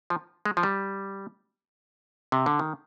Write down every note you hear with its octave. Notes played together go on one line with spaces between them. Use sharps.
F3
G#3
F3
G3
C3
D3
D#3